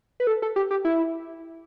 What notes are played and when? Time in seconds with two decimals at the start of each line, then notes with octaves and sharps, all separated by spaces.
0.20 B4
0.27 A4
0.42 A4
0.56 G4
0.71 G4
0.85 E4